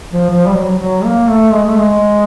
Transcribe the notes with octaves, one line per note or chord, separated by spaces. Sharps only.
F3
F3
G3
F#3
F#3
A#3
A3
G#3
A3
G#3